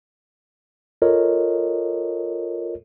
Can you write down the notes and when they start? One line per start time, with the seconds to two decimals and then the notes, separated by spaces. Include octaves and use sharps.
1.02 F4 A4 A#4 C#5 D#5